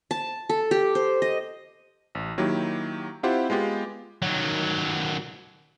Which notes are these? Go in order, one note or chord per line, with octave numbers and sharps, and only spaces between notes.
A5
A4
G4
C5
D#5
A1
D#3 F#3 A#3 E4 G4
C4 E4 F4 G4 C5 F#5
G#3 B3 F4 G4
D#3 F#3